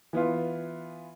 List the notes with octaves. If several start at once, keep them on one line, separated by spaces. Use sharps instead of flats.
E3 B3 F4